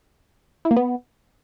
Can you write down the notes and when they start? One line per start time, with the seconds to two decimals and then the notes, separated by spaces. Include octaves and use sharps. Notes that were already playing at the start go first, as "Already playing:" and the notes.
0.65 E4
0.71 A#3
0.77 B3